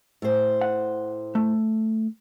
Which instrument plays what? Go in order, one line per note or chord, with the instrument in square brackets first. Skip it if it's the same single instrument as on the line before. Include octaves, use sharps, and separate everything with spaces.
[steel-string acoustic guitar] A2 C5
[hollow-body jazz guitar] F#5
A3